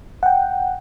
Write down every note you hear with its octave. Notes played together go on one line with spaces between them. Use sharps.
F#5 G5